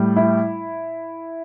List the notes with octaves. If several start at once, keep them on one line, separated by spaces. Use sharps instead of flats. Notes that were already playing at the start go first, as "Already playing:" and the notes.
Already playing: A2 G3
E4